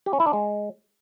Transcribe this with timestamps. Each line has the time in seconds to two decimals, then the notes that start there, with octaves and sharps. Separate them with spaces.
0.06 G4
0.13 C#4
0.20 E4
0.26 D4
0.33 G#3